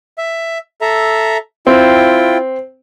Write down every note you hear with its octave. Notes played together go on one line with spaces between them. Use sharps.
E5
A4 E5 A#5
C4 E4 F4 G5